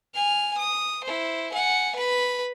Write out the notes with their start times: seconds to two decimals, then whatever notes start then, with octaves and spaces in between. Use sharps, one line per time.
0.15 G#5 F6
0.57 D#6
1.04 E4 C5
1.52 F#5 G#5
1.95 B4 B5